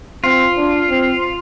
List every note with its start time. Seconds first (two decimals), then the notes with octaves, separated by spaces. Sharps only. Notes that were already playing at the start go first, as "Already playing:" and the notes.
0.24 C4 F4
0.57 D4
0.90 C4